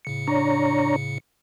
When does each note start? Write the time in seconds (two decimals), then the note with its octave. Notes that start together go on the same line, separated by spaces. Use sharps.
0.05 A2 C#3 C#7
0.27 D4 C#5 A#5